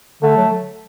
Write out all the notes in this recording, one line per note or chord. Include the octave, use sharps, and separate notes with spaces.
D3 A3
F#3